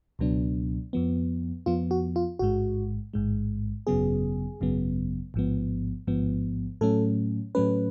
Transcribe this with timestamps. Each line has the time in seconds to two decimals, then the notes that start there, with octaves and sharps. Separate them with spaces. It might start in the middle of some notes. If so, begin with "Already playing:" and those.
0.19 C#2 B2 F#3 B3 D4
0.93 F2 F3 B3
1.66 F2 F3 B3 F4
1.91 F#4
2.16 F4
2.39 A1 G#2 G#3 F#4
3.14 A1 G#2 G#3
3.87 G#1 F#2 C#3 F#3 B3 G#4
4.61 G#1 F#2 C#3 F#3 B3
5.34 A1 G#2 F3 B3
6.07 A1 G#2 F3 B3
6.81 A2 F#3 A3 C#4 A4
7.55 A2 F#3 A3 C#4 B4